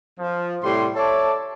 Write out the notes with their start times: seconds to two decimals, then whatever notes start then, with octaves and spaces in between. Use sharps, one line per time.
0.18 F3
0.62 A2 C3 G3 C6
0.95 A4 C#5 D5 E5 A5